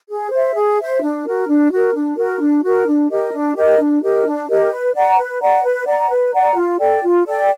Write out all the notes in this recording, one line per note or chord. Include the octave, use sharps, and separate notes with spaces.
G#4
C5 E5
G#4
C5 E5
D4
F#4 A#4
D4
F#4 A#4
D4
F#4 A#4
D4
F#4 A#4
D4
G4 A#4 D#5
D4
G4 A#4 D#5
D4
G4 A#4 D#5
D4
G4 A#4 D#5
B4
D5 F#5 A#5
B4
D5 F#5 A#5
B4
D5 F#5 A#5
B4
D5 F#5 A#5
F4
A4 D5 G5
F4
A4 D5 G5